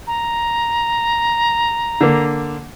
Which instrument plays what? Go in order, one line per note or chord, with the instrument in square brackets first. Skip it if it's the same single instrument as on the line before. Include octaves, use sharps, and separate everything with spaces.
[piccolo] A#5
[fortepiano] D3 A#3